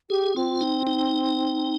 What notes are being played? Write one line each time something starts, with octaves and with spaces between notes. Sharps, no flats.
G4 G#4
C4 F4
D#4
D#4